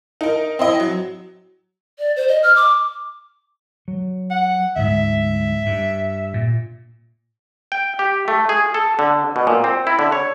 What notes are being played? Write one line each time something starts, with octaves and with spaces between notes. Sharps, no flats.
D#4 A#4
C4 E4 D#5
F#3
D5
C5
D#5
F6
D6
F#3
F#5
D2 G#2 E5
G2
A#2
G5
G4
A3
G#4
A4
D3
B2
A#2
C4
E4
D3
C#5